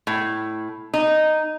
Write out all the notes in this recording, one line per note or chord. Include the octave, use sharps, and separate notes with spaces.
A2
D#4